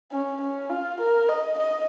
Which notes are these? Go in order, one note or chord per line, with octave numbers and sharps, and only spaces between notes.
C#4
C#4
F4
A#4
D#5
D#5